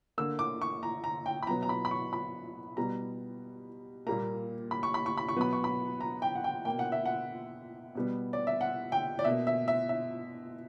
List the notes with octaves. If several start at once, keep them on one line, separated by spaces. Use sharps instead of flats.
D3 A#3 E6
D6
C#6
A#5
A#5
G5
B5
B2 F#3 B3 A#5
A#5
B5
B5
C#6
B5
B2 G3 B3 A#5
A#2 G3 A#3 A#5
B5
C#6
B5
C#6
B5
C#6
B2 F#3 B3 B5
C#6
B5
A#5
G5
F#5
G5
B2 A#3 G5
F#5
E5
F#5
B2 G3 B3
D5
E5
F#5
G5
D5
B2 A#3 E5
E5
E5
E5